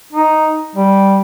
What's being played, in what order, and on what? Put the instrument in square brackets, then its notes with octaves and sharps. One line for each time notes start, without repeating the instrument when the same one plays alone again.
[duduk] D#4
G3